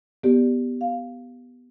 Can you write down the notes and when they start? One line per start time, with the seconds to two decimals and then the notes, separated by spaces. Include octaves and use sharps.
0.23 B3 G4 D5
0.81 F5